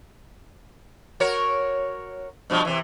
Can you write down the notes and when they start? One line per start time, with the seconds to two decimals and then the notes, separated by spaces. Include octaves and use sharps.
1.20 F#4 A#4 C#5
2.50 G2 B2 F3
2.65 C3 E3